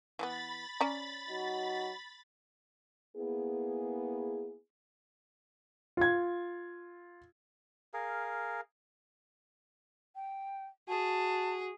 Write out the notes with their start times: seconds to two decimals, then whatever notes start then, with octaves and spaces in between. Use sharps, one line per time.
0.19 E3 A3 B3 B5 A6
0.81 C#4 D5 A#5
1.29 F#3 D#4 F#4
3.16 A#3 B3 E4 G#4
5.97 F4 G#6
7.94 G#4 A#4 F5
10.16 G5
10.89 F#4 G#4 A5